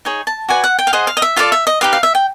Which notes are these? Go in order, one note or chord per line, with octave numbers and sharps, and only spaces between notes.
D#4 G#4 C#5
A5
F#4 B4 D5 G#5
F#5
G5
F5
G#4 C5 D#5 F#5
F5
D#5
E5
F4 A4 D5 F5
E5
D#5
D#4 G4 B4 F5
F5
E5
G5